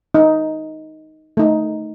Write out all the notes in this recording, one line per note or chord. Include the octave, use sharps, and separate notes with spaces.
D#4
A3 D#4